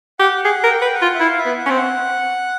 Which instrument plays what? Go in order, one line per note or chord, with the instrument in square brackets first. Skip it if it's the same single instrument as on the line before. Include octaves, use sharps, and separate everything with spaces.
[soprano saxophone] G4 [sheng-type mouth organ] F#5
[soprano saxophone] G#4 [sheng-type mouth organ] F#5
[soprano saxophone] A#4
[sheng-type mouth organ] G5
F#5
[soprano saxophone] B4
[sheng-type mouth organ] G5
F#5
[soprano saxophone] F4
[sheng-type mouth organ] E5
[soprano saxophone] E4 [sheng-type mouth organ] F5
[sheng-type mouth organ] E5
[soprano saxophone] B3
[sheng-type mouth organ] F#5
[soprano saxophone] C#4
C4
[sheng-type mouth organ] F#5